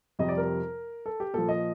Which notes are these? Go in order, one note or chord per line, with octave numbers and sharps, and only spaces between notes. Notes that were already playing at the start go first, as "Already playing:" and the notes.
F2 C3 G3 D#5
D5
A#4
A4
G4
A#2 F3 A4
D#5